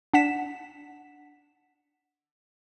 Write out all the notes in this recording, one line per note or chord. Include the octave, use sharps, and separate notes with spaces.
D4 F#5 B6 E7